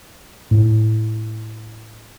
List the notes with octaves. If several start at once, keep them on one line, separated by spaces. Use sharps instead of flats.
A2